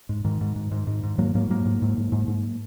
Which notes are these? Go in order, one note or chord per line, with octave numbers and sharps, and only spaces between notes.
G#2
G#2 D#3
G#2
G#2
G#2
G#2
G#2
G#2 F#3 A#3
G#2 F#3 A#3
G#2 F#3 A#3
G#2
G#2
G#2
G#2
G#2